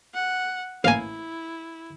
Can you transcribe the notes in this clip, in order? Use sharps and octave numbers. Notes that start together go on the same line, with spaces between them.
F#5
A1 A#3 E4 F5 G#5